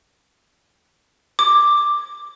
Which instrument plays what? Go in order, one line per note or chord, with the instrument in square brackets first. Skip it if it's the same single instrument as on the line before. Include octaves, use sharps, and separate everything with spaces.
[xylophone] D6